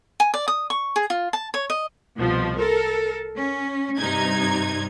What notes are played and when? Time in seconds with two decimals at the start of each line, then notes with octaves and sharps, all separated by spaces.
0.20 G#5
0.34 D5
0.48 D#6
0.70 C#6
0.96 G#4
1.10 F4
1.33 A5
1.54 C#5
1.70 D#5
2.16 C2 B2 F3
2.59 A4 A#4
3.35 C#4
3.98 G2 C3 D#4 G#6